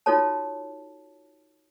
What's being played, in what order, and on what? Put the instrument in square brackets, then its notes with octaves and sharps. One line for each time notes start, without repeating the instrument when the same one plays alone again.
[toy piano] D#4 F4 F#4 A4 C#5 A5